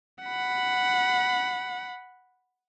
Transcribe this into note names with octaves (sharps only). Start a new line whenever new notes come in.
F#5 B5